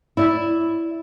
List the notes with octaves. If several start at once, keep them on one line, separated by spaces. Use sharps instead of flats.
E4 D5 E5